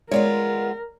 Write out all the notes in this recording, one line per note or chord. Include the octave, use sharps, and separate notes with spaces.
G#3 B3 F4 A#4 C#5 D5